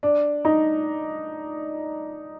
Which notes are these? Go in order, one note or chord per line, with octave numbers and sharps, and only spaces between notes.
D4
D#4